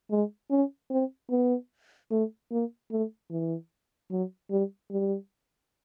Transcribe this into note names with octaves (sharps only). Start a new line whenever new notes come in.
G#3
C#4
C4
B3
A3
A#3
A3
E3
F#3
G3
G3